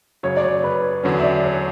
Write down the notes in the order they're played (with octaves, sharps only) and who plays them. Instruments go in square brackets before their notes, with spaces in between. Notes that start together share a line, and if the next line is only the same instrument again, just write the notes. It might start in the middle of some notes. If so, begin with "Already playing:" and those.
[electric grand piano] F#2 C#3 F#3 [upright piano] C#5
[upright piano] D5
C#5
B4
[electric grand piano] E2 D3 F#3 C#4 [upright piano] C#5
[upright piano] E5
D5
C#5